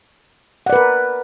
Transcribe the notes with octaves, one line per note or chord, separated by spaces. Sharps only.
A#4 B4 D5 F#5